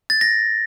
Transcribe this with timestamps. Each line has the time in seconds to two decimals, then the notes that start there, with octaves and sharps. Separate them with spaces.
0.10 A6
0.21 A#6